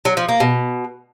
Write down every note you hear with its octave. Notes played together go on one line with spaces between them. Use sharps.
F#3
F3
A#3
B2